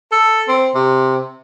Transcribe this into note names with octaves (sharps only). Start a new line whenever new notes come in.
A4
C4
C3